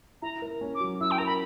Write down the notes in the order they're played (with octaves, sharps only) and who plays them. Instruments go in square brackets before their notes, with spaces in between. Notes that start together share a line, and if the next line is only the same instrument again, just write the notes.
[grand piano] E4 [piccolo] A#5
[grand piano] A#4
C#4
[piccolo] D6
[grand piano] F#3
[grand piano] E4 [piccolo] E6
[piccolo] G5
[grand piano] A#4 [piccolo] A#5
[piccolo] B5